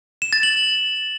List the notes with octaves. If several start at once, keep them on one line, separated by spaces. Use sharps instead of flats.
E7
A6
F#7